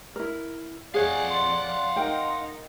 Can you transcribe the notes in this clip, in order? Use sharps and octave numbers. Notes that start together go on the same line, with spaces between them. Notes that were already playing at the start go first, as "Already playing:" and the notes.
E4 A#4
F2 G#4 C#5 D5 F5 F#5 G#5
C6
D#4 A#4 G5